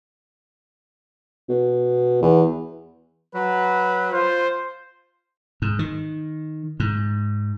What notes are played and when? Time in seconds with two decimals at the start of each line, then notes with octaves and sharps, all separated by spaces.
1.49 B2
2.22 E2
3.35 F#3 B4
4.12 F4 C5
5.62 G#2
5.79 D#3
6.80 G#2